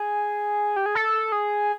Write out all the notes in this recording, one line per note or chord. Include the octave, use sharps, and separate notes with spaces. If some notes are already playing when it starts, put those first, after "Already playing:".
Already playing: G#4
G4
G#4
A4
G#4